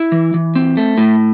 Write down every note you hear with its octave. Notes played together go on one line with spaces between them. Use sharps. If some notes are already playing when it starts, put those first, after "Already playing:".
Already playing: E4
E3
E3
C4
A3
A2